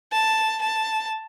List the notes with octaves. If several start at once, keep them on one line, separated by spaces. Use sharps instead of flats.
A5
A5